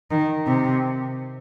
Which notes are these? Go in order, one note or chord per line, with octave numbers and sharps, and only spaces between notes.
D#3
C3